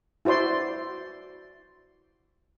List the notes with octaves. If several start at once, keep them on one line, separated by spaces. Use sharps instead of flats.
E4 F#4 C5 D5 C6